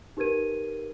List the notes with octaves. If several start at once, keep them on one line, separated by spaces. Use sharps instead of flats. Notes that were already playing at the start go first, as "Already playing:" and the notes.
D#4 G4 A#4 B4 G#6 D#7